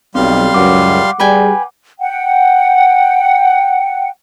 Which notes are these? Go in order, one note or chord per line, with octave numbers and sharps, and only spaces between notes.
B1 G3 C4 F5 C6
C#2 F#2 F#5 D6
G3 G#4 B4 G5 G#5
F#5 G5